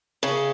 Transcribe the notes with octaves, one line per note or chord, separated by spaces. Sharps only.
C#3